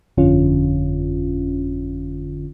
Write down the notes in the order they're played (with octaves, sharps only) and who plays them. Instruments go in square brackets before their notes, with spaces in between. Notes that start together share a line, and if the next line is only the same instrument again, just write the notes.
[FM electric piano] G1 F2 D3 C#4 F4